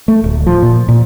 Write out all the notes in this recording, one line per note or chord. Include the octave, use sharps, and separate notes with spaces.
A3
D1
F3
A#2
A#2